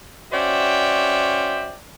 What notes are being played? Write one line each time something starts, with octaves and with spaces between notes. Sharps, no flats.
C#4 F#4 C5 D5 E5 G5